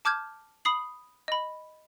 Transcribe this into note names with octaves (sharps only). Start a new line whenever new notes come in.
A5 D6 F6 G6 G#6
B5 D#6 C7 F#7
D#5 B5